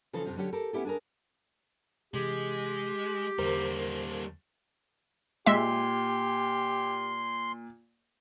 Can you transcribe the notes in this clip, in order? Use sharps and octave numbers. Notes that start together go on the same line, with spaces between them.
C#3 E3 F3 A4
F2 C3 F3
D3 F#3 C#4 G4 C#5
G4 A4 A#4
B3 C#4 E4 G4 A4
D4 G#4 A#4
C3 E3 G#3 G4
E2 D3 G3 A#3 A#4 C5
A#2 G#3 G4 E5 C6